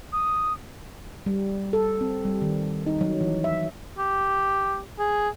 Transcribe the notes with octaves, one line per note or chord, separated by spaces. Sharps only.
D#6
G3
A4
C4
G3
D#3
D#4
F#3
E3
E5
G4
G#4